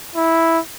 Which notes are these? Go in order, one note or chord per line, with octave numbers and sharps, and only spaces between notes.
E4